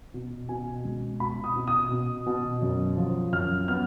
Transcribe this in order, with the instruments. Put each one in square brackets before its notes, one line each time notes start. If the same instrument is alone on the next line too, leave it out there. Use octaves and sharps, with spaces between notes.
[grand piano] B2
B2 G#5
C#2
B2 B5
D#6
B2
D#6
B2
B2
F#2
F3
F#2 F6
B3 F6